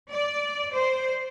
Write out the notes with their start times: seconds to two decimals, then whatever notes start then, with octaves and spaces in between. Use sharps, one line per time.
0.11 D5
0.73 C5